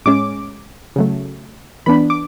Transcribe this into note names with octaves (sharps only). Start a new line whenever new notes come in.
A2 G#3 C#4 D6
C#3 F#3 A3
E3 B3 D4 B5
D6